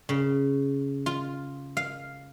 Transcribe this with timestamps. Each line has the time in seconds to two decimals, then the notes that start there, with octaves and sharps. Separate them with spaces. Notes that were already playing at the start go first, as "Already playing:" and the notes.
0.09 C#3
1.06 F4
1.77 F5